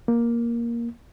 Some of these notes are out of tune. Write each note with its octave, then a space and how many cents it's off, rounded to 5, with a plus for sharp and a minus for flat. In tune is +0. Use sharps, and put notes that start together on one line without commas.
A#3 +10